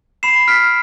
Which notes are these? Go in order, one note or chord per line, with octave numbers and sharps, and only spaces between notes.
B5 C7 E7
F6 B6 D7